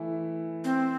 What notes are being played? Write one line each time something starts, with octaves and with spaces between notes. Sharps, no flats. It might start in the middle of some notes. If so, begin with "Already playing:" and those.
Already playing: E3 A3 E4
C4